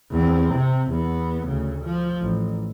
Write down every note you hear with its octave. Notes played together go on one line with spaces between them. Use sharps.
E2 C4
C3
E2 B3
D2 C#3
F3
A1